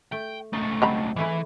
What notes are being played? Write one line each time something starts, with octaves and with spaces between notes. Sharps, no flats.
A3 G5
C#2 A3 D#4 A5
F#3 G3 C4 D#5 A#5 B5
E3 G#3 A3 E4